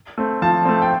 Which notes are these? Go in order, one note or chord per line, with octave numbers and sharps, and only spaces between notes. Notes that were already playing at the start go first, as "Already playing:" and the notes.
A3 C4
F3 A5
A3 C4
G5